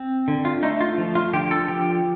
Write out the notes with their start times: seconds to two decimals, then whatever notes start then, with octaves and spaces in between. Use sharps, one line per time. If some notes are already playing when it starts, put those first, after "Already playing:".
Already playing: C4
0.28 D3
0.45 F4
0.63 A3 D#4
0.81 F4
0.98 F3
1.15 F4
1.33 D3 G4
1.51 A4
1.68 F3 G4